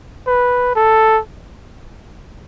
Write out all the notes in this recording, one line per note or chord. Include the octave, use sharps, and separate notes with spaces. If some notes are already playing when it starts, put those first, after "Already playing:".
B4
A4